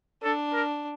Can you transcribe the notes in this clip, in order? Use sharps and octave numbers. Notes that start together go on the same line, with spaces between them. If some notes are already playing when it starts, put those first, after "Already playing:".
D4 A4
A#4